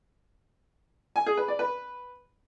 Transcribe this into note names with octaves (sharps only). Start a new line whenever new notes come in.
G#5
G#4
B4
D5
B4